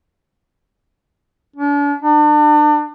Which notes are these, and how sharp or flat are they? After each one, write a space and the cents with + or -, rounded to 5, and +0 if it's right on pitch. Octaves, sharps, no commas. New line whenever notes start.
D4 -40
D4 +35